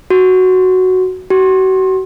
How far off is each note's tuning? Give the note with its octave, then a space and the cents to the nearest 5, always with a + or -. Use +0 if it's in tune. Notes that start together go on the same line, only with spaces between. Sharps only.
F#4 +5
F#4 +40